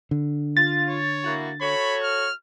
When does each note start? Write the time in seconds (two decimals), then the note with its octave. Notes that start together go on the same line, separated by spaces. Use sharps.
0.11 D3
0.57 F4 A6
0.89 C#5
1.24 A#3 E4 F#4
1.61 F#4 A4 C#5 B5
2.03 F6